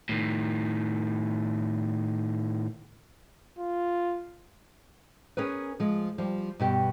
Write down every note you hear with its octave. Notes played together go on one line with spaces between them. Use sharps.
A2 D#3
F4
C#4 G#4 A#4 B4
F3 G#3
F3 G3
G2 B2 G4